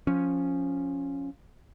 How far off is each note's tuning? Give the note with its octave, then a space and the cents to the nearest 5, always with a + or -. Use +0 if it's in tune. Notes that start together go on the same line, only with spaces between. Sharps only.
F3 +10 C#4 +0